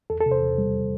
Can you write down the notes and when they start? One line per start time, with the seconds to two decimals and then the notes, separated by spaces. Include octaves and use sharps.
0.10 E2 A4
0.20 A4
0.26 C3
0.31 C5
0.42 E2
0.58 G3